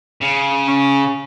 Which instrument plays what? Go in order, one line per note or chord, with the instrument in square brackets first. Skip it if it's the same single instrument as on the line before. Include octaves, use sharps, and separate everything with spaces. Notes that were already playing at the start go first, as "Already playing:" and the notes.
[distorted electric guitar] C#3
[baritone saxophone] C#4